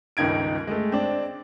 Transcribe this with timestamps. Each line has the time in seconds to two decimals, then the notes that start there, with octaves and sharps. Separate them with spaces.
0.17 G1 C#2 D#3 D#4 G#6 D7
0.67 G#3 A3
0.92 C4 D4